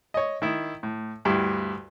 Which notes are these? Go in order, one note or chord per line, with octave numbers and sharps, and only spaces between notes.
C#5 D#5
D#3 E4
A2
D2 G2 E4 G4